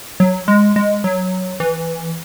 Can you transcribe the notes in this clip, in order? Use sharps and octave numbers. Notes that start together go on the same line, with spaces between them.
F#3
G#3
G#3
F#3
E3